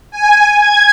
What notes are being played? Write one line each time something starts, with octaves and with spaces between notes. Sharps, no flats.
G#5
G#6